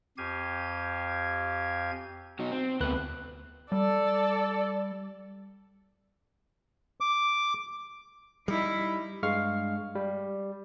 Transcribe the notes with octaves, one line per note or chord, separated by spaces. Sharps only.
F2 G4 F5 G#5 G#6
B2 F#3 D#4
C4
D2 C3 A3 B3 B4 F#6
G3 A4 D5
D6
G3 D#4 E4
G2 G#3 F5 C#6 F6 C7
G3